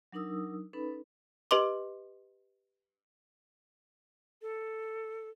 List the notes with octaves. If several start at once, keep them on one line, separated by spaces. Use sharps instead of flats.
F#3 D4 D#4 A#4 D#6 E6
C#4 D#4 A4 B4 B5
G4 B4 D#5 C6 D6
A4